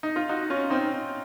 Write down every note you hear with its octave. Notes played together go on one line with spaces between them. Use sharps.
D#4
F4
D#4 F#4
C#4 F4
C4 D#4